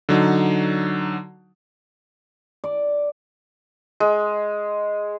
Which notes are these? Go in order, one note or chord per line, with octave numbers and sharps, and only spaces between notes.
D3 F#3 D#4
D5
G#3